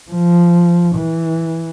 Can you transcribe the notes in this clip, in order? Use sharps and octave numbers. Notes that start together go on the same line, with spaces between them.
F3
E3